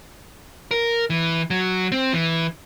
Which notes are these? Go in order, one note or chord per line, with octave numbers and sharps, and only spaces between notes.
A#4
E3
F#3
C4
E3